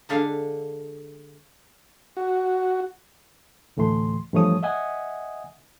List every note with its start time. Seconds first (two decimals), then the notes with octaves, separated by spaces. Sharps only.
0.09 D3 G#3 D4 A4 E5 F5
2.17 F#4
3.77 D2 A2 E3 A3 C6
4.33 G2 E3 F3 A3 C#5 D#6
4.63 D#5 E5 F#5 G#5 D#6